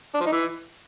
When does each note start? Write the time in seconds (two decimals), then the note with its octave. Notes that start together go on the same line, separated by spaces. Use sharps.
0.14 D4
0.20 F3
0.26 D#4
0.32 E3